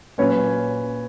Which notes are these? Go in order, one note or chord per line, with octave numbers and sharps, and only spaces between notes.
A#2 F#3 A#3 C#4 B4 C#5